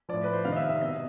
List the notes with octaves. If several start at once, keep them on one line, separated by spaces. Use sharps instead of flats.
A2 F3 D5
B4
C5
C3 D#3 F5
D#5
E5
E5
B2 D#5